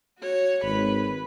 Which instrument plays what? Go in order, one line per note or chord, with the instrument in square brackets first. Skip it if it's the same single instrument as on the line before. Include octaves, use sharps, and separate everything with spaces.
[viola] F#4 C#5
[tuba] G#1 [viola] B4 B5